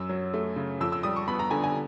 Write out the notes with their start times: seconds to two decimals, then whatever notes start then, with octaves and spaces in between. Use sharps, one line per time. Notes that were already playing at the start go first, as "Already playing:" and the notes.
Already playing: F#2 E6
0.09 F#3
0.34 A3
0.56 C#3
0.80 F2 E6
0.92 E6
1.03 G3 D#6
1.16 C#6
1.28 B3 B5
1.39 A#5
1.51 D3 G#5
1.64 G#5